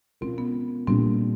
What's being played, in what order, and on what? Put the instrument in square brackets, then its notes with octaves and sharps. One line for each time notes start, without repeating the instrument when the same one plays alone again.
[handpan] B2 G#3 C#4 F4 A#4 [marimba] C4
[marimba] B3
[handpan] A#2 G3 A#3 D4 F4 [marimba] C4